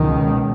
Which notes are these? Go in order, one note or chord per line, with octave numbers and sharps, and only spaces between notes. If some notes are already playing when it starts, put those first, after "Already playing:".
Already playing: C#2 B2 D#3